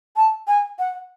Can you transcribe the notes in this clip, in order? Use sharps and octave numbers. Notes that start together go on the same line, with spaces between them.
A5
G#5
F#5